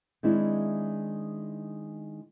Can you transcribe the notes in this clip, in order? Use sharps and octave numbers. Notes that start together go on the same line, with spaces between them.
D#3 G#3 C4 D4 E4